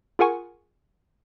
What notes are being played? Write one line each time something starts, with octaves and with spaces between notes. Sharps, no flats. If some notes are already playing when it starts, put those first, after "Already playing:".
F4 G#4 A#4 F#5 G#5 C#6